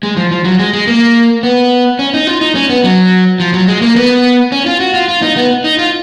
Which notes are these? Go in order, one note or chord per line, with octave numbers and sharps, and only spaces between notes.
G#3
F3
F3
F#3
G#3
G#3
A#3
B3
C#4
D#4
F4
D#4
C#4
B3
F#3
F3
F#3
G#3
A#3
B3
C#4
F4
F#4
F4
F4
D#4
B3
D#4
F4